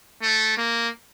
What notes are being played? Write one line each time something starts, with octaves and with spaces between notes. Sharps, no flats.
A3
A#3